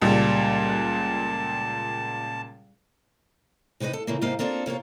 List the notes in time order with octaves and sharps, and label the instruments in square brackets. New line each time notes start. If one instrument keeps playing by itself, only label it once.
[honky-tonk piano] C#2 A#2 [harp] G3 G4 A4 [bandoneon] A5
[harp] F#6 E7
[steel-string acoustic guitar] C3 D#4 B4 C5 D#5
A4
C#3 E3 A#3
G#2 C3 A#3 G4 F5
A#3 C4 D4 F4 A4
C3 A#3 F4 C#5